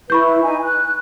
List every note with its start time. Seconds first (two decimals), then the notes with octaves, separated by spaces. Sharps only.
0.10 E4 B4 B5 C#6 G6
0.43 D#4 G#5
0.63 F#6